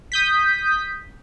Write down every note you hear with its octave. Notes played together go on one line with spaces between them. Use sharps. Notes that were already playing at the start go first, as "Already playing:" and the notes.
D#6 G6 B6